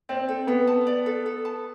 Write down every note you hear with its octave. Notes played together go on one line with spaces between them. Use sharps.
C4 D5
A4
B3 A4
A5
D5
A4
A4
A5